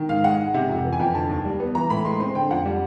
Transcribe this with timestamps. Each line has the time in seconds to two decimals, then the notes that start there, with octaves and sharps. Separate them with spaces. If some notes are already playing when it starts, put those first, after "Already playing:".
Already playing: D#3
0.09 G#2 F5
0.24 G#3 F#5
0.39 G#2
0.54 C3
0.69 F2
0.85 E3
0.93 G#5
0.99 F2 G5
1.15 D3 A5
1.29 D#2
1.45 G3
1.60 B3
1.75 E3 A#5
1.90 A2 B5
2.05 G#3 C6
2.20 C4 C6
2.35 D3 G5
2.51 F2 F#5
2.66 G3